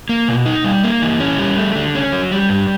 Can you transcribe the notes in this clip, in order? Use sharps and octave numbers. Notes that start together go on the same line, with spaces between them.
A#3
B2
D#4
G3
A#3
E3
C#4
G3
A3
D3
C#4
F#3
G3
G2